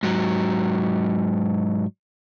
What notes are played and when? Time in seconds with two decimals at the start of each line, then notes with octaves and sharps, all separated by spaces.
0.03 G#2 F#3